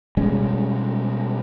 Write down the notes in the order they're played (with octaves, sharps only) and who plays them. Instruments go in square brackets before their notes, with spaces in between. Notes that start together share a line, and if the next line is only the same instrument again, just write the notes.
[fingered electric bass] B2 G3 G#3 C#4